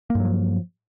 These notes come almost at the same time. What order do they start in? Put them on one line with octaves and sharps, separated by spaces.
A#3 G2 F#3 F3